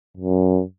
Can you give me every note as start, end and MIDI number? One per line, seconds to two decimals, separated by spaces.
0.17 0.61 42